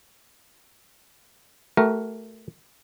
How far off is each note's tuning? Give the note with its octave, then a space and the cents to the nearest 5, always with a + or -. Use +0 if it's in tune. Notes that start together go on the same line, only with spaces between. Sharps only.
A3 +0 F#4 +45 A#4 +10